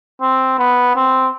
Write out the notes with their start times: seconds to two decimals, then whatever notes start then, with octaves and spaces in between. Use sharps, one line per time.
0.21 C4
0.58 B3
0.95 C4